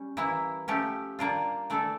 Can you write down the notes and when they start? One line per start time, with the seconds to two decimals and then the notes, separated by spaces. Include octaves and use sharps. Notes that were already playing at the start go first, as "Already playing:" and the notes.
Already playing: G3 C#4
0.17 E3 A#3 E4
0.68 F3 A3 C#4 G4
1.19 G3 A#3 D4 F4
1.70 E3 A3 D4 A4